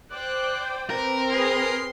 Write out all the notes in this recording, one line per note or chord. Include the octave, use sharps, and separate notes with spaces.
C5 D5 G5 F#6
C4 A#4 B4
G#4 B4 C6